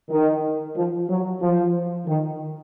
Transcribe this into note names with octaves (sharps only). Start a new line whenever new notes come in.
D#3
F3
F#3
F3
D#3